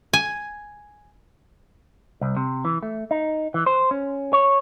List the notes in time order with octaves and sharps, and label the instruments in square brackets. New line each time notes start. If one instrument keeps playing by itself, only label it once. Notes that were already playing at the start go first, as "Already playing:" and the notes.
[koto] G#5
[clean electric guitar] C2
C3
E3
A3
D#4
E3
C5
C#4
C#5